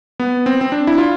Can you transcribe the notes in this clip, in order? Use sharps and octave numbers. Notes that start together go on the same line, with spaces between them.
B3
C4
C4
D4
E4
F4